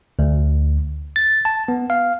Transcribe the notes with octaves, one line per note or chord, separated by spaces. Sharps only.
D2
A6
A5
B3
F5